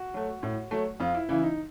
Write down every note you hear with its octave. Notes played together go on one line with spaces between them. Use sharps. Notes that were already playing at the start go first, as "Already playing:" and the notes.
Already playing: F#4
F#3 A3
A2
F#3 A3
F2 F4
E4
C#3 E3 E4
D#4